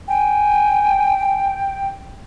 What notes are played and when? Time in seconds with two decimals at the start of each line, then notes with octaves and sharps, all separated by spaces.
0.08 G5 G#5